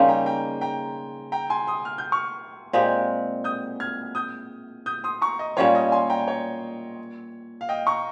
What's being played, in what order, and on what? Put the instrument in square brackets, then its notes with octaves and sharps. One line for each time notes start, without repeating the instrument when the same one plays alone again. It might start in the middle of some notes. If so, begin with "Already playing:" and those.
Already playing: [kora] C#3 G3 A#3 D#4 [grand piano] G#5 C6
[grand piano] G5 A#5
G5 A#5
G5 A#5
G5 A#5
G#5 C6
C6 D#6
F6
G6
C#6 F6
[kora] A#2 G#3 C4 G4
[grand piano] D#6 G6
F6 G#6
D#6 G6
D#6 G6
C6 D#6
A#5 C#6
D#5
[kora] A#2 G3 C#4 F4 [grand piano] C#5
[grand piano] D#5
G#5 C6
G5 A#5
C#5
F5
D#5 G5
A#5 C#6